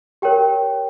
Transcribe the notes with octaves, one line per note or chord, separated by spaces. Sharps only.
G4 A#4 C#5 G5